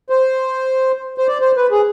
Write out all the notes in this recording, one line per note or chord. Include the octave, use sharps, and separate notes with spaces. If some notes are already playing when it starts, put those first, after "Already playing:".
C5
C5
D5
C5
B4
G#4